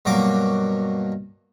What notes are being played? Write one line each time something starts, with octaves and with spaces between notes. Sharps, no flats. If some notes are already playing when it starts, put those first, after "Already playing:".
G2 B2 F#3 A#3 D6